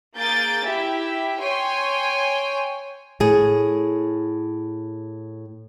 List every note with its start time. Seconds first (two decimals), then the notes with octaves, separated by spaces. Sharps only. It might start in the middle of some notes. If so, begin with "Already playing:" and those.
0.15 A#3 G#4 G6 A6 D7
0.65 E4 G4 E5
1.40 C#5 G5 G#5 C6
3.20 A2 G#4